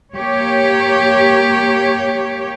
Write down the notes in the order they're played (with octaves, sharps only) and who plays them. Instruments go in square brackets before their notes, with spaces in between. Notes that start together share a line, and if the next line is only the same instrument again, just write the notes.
[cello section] A#3 G4 C#5